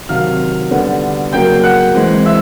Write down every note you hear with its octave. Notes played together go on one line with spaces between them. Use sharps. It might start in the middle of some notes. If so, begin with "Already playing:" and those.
C3 D#3 F#3 F5 F6
D3 G3 B3
C#3 F#3 A#3 G5 G6
F#5 F#6
E3 G#3 C4
E5 E6